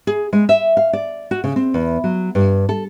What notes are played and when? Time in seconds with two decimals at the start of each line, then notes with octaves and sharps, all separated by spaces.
0.07 G#4
0.33 G#3
0.49 E5
0.77 F5
0.93 D5
1.31 F#4
1.44 C#3
1.56 C4
1.74 E2
2.04 F#3
2.35 G2
2.69 A4